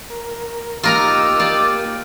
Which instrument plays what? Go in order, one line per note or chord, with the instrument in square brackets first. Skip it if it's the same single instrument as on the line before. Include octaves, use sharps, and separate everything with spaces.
[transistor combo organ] A#4
[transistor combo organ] A#3 G4 [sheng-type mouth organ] D#4 D6 E6 [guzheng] F4 A#4 A#5
[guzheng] F4 D5